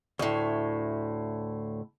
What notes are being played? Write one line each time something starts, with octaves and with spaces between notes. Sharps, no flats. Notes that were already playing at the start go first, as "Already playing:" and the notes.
D2 A2